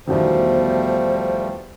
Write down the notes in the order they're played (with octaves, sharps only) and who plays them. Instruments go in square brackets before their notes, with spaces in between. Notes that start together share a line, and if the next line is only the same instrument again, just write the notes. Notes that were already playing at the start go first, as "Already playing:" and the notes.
[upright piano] E2 B2 D#3 [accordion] F3 G3 A3 [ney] C5